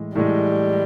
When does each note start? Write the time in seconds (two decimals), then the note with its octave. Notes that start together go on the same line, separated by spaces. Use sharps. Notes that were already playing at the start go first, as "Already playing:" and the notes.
Already playing: A2 E3 G#3
0.15 A2 E3 G3 G#3